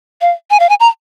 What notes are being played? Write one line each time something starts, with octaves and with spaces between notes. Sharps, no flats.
F5
G#5
F5
G#5
A#5